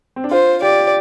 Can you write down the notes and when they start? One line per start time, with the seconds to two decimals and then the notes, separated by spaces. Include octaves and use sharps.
0.16 C4
0.24 D4
0.31 F4 C5
0.62 G4 D5